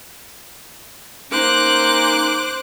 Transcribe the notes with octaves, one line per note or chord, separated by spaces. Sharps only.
A#3 C#4 D#4 C5 D6 F#6